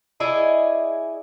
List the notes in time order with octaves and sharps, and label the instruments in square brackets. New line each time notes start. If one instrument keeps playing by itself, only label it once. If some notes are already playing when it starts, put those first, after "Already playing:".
[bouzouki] E4 G#4 D5 D#5